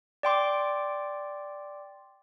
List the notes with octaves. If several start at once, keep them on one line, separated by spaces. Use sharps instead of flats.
D5 G5 C6 D6